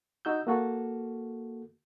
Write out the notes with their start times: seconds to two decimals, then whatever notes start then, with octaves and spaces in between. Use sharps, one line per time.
0.25 D#4 F#4 E6 G6
0.47 A#3 F#4 A4